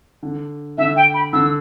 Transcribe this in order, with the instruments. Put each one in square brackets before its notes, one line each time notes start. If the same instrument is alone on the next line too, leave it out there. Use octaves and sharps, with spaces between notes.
[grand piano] D3
[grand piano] D3 [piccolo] E5
[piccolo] G5
B5
[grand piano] D3 [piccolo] E6